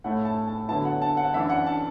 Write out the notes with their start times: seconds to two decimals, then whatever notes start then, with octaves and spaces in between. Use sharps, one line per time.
0.04 A2 A3 E4 F#5
0.25 A5
0.48 A5
0.69 D3 F#3 B3 E4 A5
0.85 F#5
1.02 A5
1.17 F#5
1.28 F#5
1.34 F#2 E3 D4 E5
1.50 F#5
1.66 A5